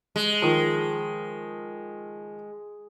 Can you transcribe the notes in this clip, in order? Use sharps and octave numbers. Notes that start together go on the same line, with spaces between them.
G#3
D#3 F3